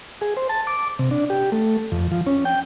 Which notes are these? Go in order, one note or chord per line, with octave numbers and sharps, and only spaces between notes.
G#4
C5
A5
D6
C3
D4
G4
A3
F2
F3
C#4
G5